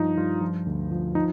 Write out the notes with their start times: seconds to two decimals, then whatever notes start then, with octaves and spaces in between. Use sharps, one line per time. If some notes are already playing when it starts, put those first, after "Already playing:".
Already playing: G2 F3 D#4
0.17 G2 F4
0.41 F3
0.66 D2
0.92 F3
1.15 F3 D#4